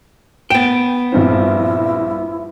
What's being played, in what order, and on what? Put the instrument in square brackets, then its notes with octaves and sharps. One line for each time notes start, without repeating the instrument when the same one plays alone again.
[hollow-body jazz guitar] B3 G5 [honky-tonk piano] E7
[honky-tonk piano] A#1 G2 C4 [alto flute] E4